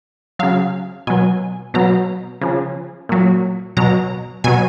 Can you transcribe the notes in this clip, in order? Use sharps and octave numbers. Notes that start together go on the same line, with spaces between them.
C#3 F#3 F5
B2 F#3 G#5
B2 F#3 A#5
C#3 F3
A#2 F#3
B2 F#3 A#5
B2 F#3 G#5